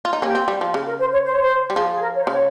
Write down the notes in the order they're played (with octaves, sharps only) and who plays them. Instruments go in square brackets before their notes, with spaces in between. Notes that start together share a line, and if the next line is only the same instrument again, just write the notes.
[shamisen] F4
D#4
[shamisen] A#3 C#4 [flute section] G4
[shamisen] C4
G3
F3
[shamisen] C#3 [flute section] G#4
[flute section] A#4
C5
C#5
C5
C#5
C5
[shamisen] G3
[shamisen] F3 [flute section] G#4
[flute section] G#4
A#4
C#5
C5
[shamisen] C#3 [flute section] C#5